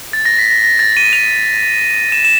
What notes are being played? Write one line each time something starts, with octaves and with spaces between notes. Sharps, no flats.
A6
A#6
B6
A#6
A#6
A6
D#7
F7
E7
E7